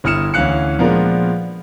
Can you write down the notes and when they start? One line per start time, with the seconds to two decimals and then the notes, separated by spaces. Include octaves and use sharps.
0.04 G1 E4 D#6 F6 C#7 E7
0.34 D2 E3 C#4 F5 F#6 C#7
0.79 A#2 F3 G#3 B3 D4 A#4